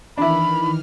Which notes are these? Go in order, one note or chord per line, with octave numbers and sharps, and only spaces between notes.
D#3 E3 D4 E4 B5 F6